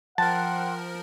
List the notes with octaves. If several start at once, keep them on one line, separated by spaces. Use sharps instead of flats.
F3 A#4 F#5 G5 A5 C6 F#6